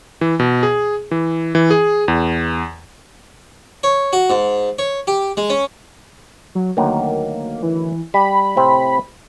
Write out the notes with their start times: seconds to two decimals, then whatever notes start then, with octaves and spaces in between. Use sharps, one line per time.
0.21 E3
0.40 B2
0.63 G#4
1.11 E3
1.55 E3
1.70 G#4
2.08 E2
3.83 C#5
4.13 F#4
4.30 G#2
4.79 C#5
5.07 G4
5.37 G#3
5.50 C#4
6.55 F#3
6.77 D2 D#3 F#3 A#3
7.63 E3
8.14 G3 B5
8.56 A2 C3 C4